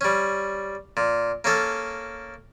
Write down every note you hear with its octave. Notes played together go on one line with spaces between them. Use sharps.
G3 C#4
A#2
A#3 C#4 A4